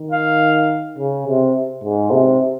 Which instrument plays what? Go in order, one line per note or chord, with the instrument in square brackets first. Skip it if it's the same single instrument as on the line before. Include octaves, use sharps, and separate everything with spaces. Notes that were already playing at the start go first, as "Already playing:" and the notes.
Already playing: [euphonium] D#3
[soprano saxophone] F5
[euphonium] C#3
C3
G#2
C3